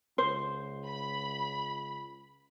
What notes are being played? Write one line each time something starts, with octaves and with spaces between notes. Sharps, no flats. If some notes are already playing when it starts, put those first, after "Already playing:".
C#2 C5
B5